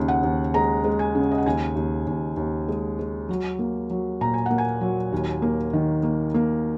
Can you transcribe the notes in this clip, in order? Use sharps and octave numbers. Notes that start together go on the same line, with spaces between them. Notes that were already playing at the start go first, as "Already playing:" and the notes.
Already playing: D#2 C#3
F#5
D#2
G#3 A#5
G#3
G#5
C#3
D#5
F#5
D#2 G#5
D#2
D#2
D#2
G#3
G#3
F#3
A#3
F#3
A#2 A#5
G#5
A#3 F#5
G#5
F#3
D#2
A#3
D#3
A#3
A#3